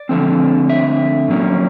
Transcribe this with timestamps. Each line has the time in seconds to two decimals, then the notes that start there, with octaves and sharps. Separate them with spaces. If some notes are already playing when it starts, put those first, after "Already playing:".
Already playing: D5
0.09 D3 F3 A3 C4
0.69 E5
1.28 A2 F#3 A#3 C#4